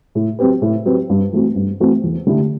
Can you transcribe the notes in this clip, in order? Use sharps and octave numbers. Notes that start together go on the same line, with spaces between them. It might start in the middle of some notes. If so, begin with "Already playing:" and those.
A2
F#3 C4 G4 B4
A2
F#3 C4 G4 B4
G2
E3 A3 C4 F#4
G2
E3 A3 C4 F#4
E2
D3 A3 E4 G4